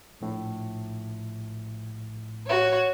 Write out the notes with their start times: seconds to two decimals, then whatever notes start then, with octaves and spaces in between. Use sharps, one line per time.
0.21 A#1 A2
2.46 F#4 C#5